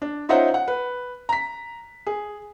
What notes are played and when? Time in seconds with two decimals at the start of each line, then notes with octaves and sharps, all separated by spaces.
0.02 D4
0.29 C#4 D#4 F4 C5 E5 F#5
0.54 F#5
0.68 B4
1.29 A#5 B6
2.07 G#4